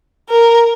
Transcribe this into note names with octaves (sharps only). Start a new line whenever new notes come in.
A#4